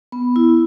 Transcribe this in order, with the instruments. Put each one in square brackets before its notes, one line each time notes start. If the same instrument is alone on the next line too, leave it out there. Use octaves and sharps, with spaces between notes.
[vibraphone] B3
E4